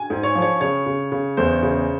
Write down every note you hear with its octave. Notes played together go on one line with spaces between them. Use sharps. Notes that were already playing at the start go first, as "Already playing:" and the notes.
Already playing: G#5
G#2
C#5
F3
C#5
C#3 C#5
C#3
C#3
E2 C5
C#3